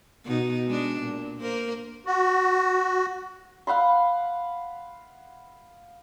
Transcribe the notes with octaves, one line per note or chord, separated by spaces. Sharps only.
B2 D#4
G#3 D4
A#2
A#3 A#4 C5
F#4
F5 F#5 B5 C6